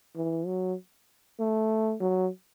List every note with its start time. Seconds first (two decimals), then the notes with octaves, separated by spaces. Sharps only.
0.16 E3
0.46 F#3
1.39 A3
2.00 F#3